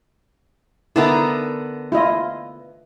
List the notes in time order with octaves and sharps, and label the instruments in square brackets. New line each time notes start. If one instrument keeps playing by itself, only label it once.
[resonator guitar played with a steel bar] D3 B3 A#4 [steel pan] D#4 E4
[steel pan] E4 F4 D#5